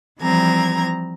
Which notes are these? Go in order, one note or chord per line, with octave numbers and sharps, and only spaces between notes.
E3 F3 G3 C4 A#5 G#6